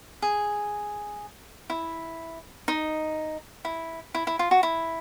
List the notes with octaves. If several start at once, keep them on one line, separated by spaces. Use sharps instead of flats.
G#4
E4
D#4
E4
E4
E4
F4
F#4
E4